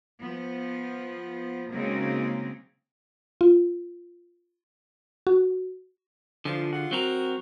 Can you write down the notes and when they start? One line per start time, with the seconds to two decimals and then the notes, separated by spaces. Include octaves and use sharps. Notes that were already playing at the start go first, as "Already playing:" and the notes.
0.21 F3 B3
1.71 C#3 F#3 G#3 A#3 C4 D#4
3.41 F4
5.27 F#4
6.45 D3 E3 F3
6.73 F4 G#4 F#5
6.91 F#3 C4 F#4 A#4